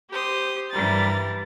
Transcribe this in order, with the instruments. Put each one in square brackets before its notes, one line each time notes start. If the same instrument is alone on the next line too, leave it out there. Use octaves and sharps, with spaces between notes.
[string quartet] G4 C5 D#6
G2 E3 G3 A#4 A6